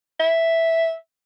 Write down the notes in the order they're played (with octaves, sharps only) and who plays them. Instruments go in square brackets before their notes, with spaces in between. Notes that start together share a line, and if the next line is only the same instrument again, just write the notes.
[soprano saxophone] E5